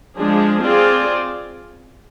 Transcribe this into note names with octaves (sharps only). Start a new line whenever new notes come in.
F3 G#3 D4 G#4
C4 F4 G#4 D5